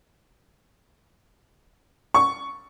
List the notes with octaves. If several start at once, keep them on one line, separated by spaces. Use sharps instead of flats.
C#6